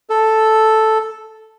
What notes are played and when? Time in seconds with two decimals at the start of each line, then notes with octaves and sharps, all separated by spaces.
0.10 A4